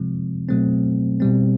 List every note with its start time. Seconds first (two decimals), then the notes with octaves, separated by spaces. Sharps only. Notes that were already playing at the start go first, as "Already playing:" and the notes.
Already playing: C3 F3 G#3 C4
0.49 B2 F#3 A3 C4
1.20 B2 G3 C4